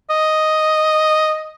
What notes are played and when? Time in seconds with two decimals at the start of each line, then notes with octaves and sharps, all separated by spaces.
0.10 D#5